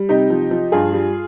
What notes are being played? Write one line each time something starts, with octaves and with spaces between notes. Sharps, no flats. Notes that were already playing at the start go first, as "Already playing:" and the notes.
Already playing: G3
C3 D#4 G4
F3
F3
G2 F4 G#4
G3